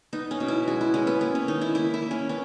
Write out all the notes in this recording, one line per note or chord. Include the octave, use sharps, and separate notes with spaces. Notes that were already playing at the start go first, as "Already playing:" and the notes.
B3 D#4
C#4
B2
E4
G#3 F#4
E4
G#3 C#4
B3
A#3 C#4
C#4
D#3 D#4
E4
A#3 E4
E4
A#3
C#4
B3 C#4